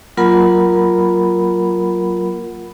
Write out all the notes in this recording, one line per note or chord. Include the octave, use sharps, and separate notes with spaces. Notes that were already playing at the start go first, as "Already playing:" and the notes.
F#3 A#3 F4 A#4 F#5 B5